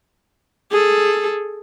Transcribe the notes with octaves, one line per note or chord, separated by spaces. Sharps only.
G#4 A4